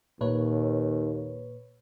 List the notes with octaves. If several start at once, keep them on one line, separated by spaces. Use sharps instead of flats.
D#2 A#2 B4 C#5